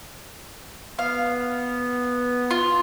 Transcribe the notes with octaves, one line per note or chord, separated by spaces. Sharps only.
B3 F5
F4